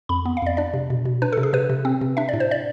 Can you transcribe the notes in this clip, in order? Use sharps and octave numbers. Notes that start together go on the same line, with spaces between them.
F2 B5
B3
F5
F2 D5
D4 D5
C3
B2
B2
D4 B4
A4
C3
G#4
C3 B4
C3
C4
C3
D4 E5
A2 D5
C5
D5